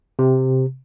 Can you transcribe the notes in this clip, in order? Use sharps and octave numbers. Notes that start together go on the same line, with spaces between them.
C3